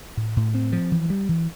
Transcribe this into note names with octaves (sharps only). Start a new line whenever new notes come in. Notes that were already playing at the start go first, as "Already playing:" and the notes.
A2
A2
C4
F3
E3
G3
E3